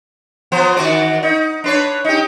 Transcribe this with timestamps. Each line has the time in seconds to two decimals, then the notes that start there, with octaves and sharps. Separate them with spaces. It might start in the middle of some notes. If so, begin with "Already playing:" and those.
0.52 F3 B3 C5
0.77 D#3 F#4 D5
1.23 D#4
1.64 D4 B4 C#5
2.04 D#4 G4